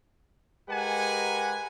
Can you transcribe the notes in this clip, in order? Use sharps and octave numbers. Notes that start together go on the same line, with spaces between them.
G#3 G4 A#4 B4 F#5 G#5